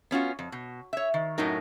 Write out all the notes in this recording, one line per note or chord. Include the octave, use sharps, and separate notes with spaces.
B3 C#4 F4 F#4
F2
B2
C#5 E5
D#3
F#2 A2 F#3 D#4 A#4